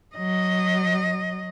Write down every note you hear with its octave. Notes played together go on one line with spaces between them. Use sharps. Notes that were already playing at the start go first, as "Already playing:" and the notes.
F#3 D#5